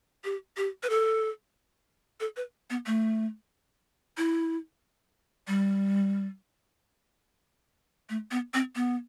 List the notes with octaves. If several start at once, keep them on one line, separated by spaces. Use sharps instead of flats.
G4
G4
B4
A4
A4
B4
B3
A3
E4
G3
A3
B3
C4
B3